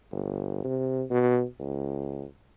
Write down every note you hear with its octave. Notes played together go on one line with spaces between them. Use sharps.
G1
C3
B2
C#2